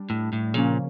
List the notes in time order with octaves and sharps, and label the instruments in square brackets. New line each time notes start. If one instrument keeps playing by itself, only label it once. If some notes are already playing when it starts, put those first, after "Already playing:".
Already playing: [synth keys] G3 D4
[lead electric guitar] A2
A2
[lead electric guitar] A#2 [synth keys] C#3 F3 A#3 C#4